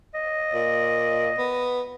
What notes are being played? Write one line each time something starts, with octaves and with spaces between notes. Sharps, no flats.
D#5
A#2
B3